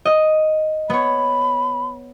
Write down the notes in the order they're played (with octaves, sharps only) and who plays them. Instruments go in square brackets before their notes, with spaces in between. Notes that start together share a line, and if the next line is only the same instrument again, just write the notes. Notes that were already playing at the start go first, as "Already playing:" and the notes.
[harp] D#5
[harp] B3 C#5 [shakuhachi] B5